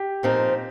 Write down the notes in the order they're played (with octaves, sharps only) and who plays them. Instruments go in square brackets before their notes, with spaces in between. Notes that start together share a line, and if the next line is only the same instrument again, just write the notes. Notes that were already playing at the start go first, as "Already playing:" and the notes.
Already playing: [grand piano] G4
[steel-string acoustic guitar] A#2 F3 C4 D#4 A#4